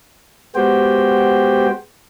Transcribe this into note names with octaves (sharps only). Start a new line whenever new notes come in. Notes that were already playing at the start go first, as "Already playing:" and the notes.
G#3 B3 F#4 G4 C5 G5